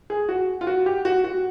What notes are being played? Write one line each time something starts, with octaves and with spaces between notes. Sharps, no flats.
G#4
F#4
F4
F#4
G4
F#4
F#4